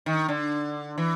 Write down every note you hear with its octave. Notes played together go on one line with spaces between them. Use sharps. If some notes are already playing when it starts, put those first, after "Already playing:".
D#3
D3
E3